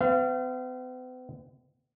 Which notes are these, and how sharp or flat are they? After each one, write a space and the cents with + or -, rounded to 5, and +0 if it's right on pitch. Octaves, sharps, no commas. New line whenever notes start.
B3 +45 F5 -30